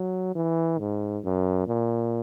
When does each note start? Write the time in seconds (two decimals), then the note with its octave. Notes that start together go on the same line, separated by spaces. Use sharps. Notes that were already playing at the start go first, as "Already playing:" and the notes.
Already playing: F#3
0.35 E3
0.79 G#2
1.24 F#2
1.68 A#2